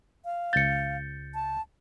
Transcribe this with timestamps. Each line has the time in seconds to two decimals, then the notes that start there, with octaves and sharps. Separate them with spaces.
0.25 F5
0.53 C#2 G6 A6 C#7
1.34 A5